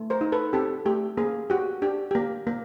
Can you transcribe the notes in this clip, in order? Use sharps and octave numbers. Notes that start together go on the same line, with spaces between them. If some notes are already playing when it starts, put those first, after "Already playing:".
Already playing: A3
A#4 C5
D#4
A4 B4
C4 G4 A4
A3 G4
A#3 G#4
F#4 G4
D4 G4
A#3 G4
A#3